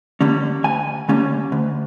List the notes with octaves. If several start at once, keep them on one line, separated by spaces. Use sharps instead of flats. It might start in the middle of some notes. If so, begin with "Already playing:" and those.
D3 G3 A#3 C#4
D2 G#5
D3 G3 A#3 C#4
D2